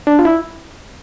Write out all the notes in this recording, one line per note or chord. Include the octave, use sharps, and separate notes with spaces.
D4
F4
E4